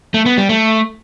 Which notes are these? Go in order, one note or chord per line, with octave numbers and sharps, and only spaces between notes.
A3
B3
G3
A3